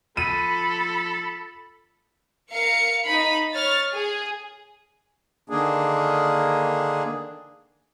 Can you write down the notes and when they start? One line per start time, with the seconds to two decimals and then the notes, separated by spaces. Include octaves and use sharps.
0.17 F3 A4 B5 D#7
2.52 A#4 F5 C#7
3.05 D#4 B5
3.54 C#5 F6 A6
3.94 G#4
5.50 D3 D#3 A#3 D4 G#4